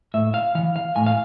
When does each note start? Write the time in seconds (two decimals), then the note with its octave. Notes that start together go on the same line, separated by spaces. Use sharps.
0.14 A2 E5
0.34 F5
0.55 E3 F5
0.76 F5
0.96 A2 G#5
1.06 F5